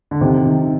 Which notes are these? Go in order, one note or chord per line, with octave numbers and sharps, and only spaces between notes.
D3
C3 D#3
D#3